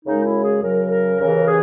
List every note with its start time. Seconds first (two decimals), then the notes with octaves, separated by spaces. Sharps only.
0.05 F#2 C#3 G#3 D#4
0.25 E4
0.44 G#4
0.62 F#2 C#3 F#3 A#4
0.91 A#4
1.19 D#2 C#3 E3 A#4
1.47 G#4